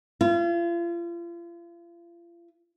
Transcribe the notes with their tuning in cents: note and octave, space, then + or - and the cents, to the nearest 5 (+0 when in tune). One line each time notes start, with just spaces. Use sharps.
F4 -40